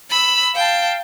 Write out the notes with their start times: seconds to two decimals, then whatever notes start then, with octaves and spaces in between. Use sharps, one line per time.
0.10 B5 E6
0.55 F5 G5 A5